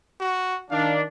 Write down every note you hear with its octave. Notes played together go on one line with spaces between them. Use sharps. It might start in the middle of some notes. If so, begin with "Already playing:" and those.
F#4
D#3 D4 F5